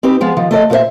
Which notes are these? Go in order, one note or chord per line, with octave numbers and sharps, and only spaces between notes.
C4 D#4 G4 B4
F3 G#3 B3
D#3 F3
A3 A4 D5 D#5
A#2 F#4 A#4 C5 E5